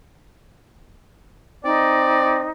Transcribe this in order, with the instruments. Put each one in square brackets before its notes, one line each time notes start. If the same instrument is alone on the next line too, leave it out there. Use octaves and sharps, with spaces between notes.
[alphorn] C4 [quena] D#4 [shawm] D5